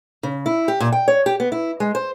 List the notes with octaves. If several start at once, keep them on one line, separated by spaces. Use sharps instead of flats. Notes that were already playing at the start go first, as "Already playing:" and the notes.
C#3
E4
G4
A#2
G5
C#5
G4
B3
E4
G#3
C5